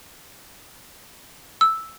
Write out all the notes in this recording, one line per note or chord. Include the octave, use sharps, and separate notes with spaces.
E6